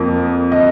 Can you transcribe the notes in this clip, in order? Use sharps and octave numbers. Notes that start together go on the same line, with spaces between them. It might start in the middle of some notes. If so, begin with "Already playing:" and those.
Already playing: F2 F3 A#3
D#5